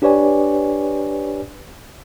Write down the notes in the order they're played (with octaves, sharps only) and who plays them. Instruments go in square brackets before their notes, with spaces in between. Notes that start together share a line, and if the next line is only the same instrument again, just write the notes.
[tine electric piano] D4 G4 B4 C#5 D5 G#5